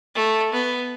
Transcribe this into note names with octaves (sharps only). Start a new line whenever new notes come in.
A3
B3